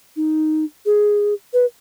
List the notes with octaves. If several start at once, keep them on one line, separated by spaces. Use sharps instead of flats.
D#4
G#4
B4